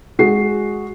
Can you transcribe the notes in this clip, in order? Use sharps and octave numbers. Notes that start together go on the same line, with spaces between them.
G#3 F#4 C7